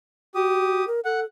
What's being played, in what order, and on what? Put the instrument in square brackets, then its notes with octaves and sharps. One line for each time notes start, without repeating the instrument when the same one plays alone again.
[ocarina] F#4 [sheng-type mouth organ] G4 D#6
[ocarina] A#4
[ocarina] A4 [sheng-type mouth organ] F#5